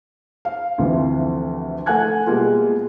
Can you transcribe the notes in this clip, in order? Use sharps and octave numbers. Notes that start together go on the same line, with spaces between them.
F5
D2 C3 E3 F3
A3 F#5 G#5 F#6 G#6
B2 G3 G#3 A#3 F4